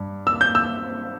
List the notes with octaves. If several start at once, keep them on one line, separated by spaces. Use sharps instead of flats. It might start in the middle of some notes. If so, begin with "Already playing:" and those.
Already playing: G2
E6
G6
E6